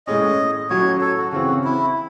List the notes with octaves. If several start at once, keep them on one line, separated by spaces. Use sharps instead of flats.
A2 G#3 C#4 D#5
A2 F#3 C#4 F#4 C#5
A4
F#4
C#3 E3 C4 F#4
E4